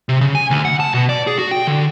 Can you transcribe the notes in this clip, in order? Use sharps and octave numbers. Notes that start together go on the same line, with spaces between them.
C3
C#3
G#5
D2
F#5
A5
B2
D5
G#4
F#4
G5
D3